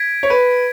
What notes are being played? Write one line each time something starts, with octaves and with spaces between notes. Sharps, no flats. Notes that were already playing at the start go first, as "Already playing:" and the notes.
Already playing: G#6 B6 D7
C#5
B4